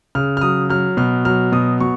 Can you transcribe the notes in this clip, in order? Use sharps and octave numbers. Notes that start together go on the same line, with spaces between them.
C#3 F6
F6
F#3 D#6
F#3 F6
B2 F6
F#3 F6
B2 D#6
B2 C#6